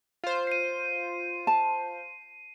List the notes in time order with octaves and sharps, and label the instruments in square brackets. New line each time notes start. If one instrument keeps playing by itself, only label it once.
[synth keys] F4 C5
[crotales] C7 D#7
[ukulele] A5